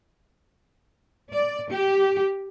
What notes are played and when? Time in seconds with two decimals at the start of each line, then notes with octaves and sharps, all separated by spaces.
1.30 D5
1.70 G4